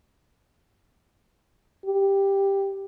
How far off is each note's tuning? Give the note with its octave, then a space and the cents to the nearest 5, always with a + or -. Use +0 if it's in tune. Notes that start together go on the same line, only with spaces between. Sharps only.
G4 +5